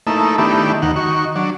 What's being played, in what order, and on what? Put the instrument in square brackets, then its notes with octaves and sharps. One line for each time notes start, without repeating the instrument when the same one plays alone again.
[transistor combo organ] A3 A#3 D#4 E4 A4
D#3 A3 B3 D4 E4 G4
D#2 D#3 F#5
D#3 F#4 C#6
F#3 D4